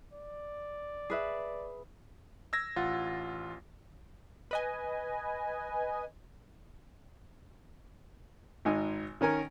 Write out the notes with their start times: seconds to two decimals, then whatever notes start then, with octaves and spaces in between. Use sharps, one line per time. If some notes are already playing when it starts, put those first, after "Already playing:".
0.13 D5
1.10 G#4 B4 E5
2.53 E6 G#6 A#6
2.76 A1 F4 F#5 A6
4.51 B4 D#5 G#5
8.65 G#1 G#2 D#4 G#5
9.21 D#3 C#4 A#4 G#5